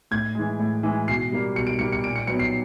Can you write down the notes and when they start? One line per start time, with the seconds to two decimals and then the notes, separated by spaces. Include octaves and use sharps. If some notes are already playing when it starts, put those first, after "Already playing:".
0.11 A2 G#6
0.35 E3 G#3
0.59 A2
0.83 E3 G#3
1.08 B2 C7
1.32 G3 A#3
1.56 B2 C#7
1.67 D7
1.79 G3 A#3 C#7
1.92 C#7
2.04 A#2 D7
2.16 C#7
2.27 F#3 B3 C#7
2.39 C7